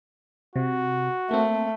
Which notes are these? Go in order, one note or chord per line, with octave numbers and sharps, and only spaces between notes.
C3 F#4
A3 A#3 C4